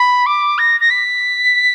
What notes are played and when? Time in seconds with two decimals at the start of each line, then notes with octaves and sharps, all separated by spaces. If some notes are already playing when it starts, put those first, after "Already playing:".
Already playing: B5
0.26 D6
0.58 A#6
0.80 A#6
0.90 B6